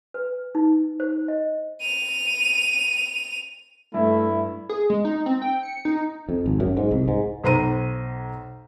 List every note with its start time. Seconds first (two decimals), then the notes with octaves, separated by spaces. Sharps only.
0.14 B4
0.55 D#4
1.00 C5
1.28 D#5
1.81 D#7 F7
3.94 G2 A3 E4
4.69 G#4
4.90 G#3
5.05 D#4
5.26 C4
5.42 G5
5.63 C#7
5.85 D#4
6.29 F2
6.46 G#1
6.60 F#2
6.77 G#2
6.91 C2
7.08 G#2
7.44 B1 C5 A#5 D#7